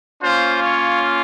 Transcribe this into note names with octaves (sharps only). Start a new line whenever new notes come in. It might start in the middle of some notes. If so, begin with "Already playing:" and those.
A#3 C#4 F4 C5
C#5